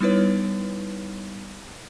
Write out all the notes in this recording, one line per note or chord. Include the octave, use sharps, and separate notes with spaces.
G3 B3 D#4 E4 B4 C#5